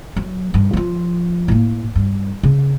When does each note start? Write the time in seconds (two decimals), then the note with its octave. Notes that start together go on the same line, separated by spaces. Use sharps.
0.16 F#3
0.54 G2 D#3
0.73 F3 F4
1.48 A2 A#3
1.96 G2
2.43 C#3